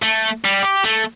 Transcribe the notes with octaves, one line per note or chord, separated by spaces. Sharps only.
A3
G3
G4
A3